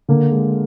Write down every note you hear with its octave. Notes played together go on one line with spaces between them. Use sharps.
D3 A#3
G#3